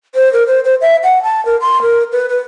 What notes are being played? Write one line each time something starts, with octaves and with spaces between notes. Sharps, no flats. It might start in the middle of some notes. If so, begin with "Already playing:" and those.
C5
A#4
C5
C5
E5
F#5
A5
A#4
C6
A#4
B4
B4